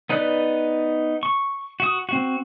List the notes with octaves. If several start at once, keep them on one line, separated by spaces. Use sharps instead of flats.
B3 D#4 B4 D5 F#6
C#6
F#4 D#6
C4 F#4